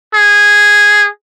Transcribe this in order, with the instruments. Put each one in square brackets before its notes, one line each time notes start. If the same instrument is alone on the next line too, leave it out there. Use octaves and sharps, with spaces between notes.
[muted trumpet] G#4